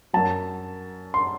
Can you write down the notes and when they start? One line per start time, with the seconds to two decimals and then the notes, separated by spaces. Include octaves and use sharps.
0.13 F#2 F#3 A5
1.14 C6